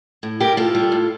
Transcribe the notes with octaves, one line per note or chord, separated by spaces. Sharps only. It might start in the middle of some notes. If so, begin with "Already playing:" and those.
A2
G3 G4 A#4
A2 F4 A4
G3
A2